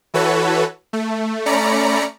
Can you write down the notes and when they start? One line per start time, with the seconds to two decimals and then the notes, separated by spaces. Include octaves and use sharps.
0.14 E3 F#4 A4 B4 C#5
0.93 A3
1.46 A3 C#4 D5 A#5 B5 C#7